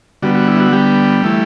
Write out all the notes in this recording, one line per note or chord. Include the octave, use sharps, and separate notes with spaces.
D3 G3 B3 F#4
F#4
E4
F#4
G3 G4
E3 A3 E4